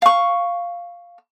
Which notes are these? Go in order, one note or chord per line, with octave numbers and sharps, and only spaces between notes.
F5 C#6